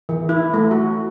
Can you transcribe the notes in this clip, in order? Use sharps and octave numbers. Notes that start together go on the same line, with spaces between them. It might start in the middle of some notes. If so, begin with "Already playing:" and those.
E3
E4
A3
F#4